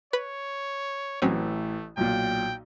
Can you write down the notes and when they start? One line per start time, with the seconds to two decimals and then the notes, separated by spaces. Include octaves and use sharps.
0.13 B4 C#5
1.22 A1 E3 F#3 A3 C4 C#4
1.97 B1 A#2 G5